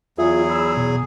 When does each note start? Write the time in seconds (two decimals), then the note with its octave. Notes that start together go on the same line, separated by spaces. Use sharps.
0.18 E2 F#3 F4 G#4 E5
0.50 B5 E6
0.77 B2